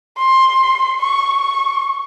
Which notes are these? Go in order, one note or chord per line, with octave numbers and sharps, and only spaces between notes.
C6
C#6
C#6